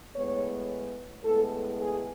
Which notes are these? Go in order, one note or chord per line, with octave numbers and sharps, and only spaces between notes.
A2 G#3 B3 C#5
A2 G#3 B3 A4
G#4